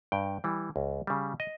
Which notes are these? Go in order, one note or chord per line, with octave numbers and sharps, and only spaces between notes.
G2 G5
E3 G3
C#2
C#3 G3
D#5